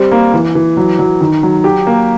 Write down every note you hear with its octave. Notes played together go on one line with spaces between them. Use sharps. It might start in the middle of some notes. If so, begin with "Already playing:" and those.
Already playing: G3 C4
A#3
E3
E3
F#3
F#3
D#3
F#3
G4
A#3